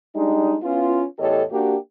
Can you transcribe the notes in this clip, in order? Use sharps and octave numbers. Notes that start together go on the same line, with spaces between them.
G3 G#3 D4 D#4
B3 C#4 E4 F4
E2 A2 G4 A4 C#5 D#5
A#3 D4 F#4 G4